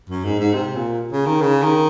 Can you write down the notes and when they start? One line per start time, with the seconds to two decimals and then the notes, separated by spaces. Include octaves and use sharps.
0.09 F#2
0.24 G#2
0.39 G#2
0.54 C3
0.76 A#2
1.12 C#3
1.26 D#3
1.41 C#3
1.62 D#3